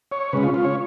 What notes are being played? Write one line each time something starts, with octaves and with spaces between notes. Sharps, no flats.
C#5
C#3 G#3 C#4 B4
F4
F4
C#5